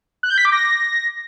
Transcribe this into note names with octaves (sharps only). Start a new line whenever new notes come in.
F#6
G6
B6
D6
A#6